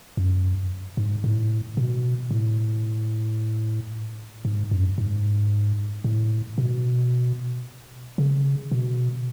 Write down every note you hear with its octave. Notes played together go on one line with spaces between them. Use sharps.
F#2
G#2
A2
B2
A2
G#2
F#2
G#2
A2
B2
C#3
B2